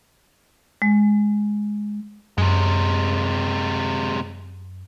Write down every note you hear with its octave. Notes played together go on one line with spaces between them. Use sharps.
G#3
F#2 C3 G#3